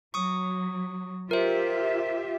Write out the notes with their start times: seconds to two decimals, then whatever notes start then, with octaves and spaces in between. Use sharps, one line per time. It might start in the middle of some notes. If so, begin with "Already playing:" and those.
0.14 F#3 C#6 D#6
1.31 F4 G4 A#4 C5 E5